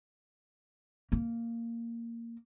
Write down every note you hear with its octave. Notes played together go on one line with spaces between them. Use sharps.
A#3